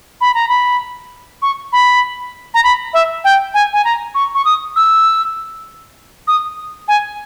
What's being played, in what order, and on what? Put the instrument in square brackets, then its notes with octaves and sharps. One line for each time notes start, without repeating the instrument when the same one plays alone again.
[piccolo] B5
A#5
B5
C#6
B5
A#5
B5
E5
G5
G#5
G#5
A#5
C#6
C#6
D#6
E6
D#6
G#5